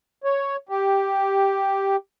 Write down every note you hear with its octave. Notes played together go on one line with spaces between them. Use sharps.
C#5
G4